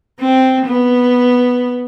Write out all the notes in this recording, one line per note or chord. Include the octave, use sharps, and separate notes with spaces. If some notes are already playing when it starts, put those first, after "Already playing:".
C4
B3